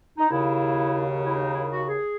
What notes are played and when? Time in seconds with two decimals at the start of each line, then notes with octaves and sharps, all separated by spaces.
0.18 D#4
0.29 D#2 C#3 F#3 E4
1.24 E4
1.35 D#4
1.52 E4
1.70 F#4
1.87 G#4